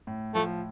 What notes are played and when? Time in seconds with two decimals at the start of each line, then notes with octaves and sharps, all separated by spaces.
0.07 A2
0.34 F3 A3